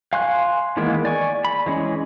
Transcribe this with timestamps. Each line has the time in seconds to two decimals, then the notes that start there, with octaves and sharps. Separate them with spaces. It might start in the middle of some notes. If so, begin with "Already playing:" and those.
0.13 F5 G#5 C6 C#6 F#6
0.77 D#3 E3 G#3 A#3 B3
1.05 D5 G#5 C#6
1.45 B5
1.66 E3 G#3 C#4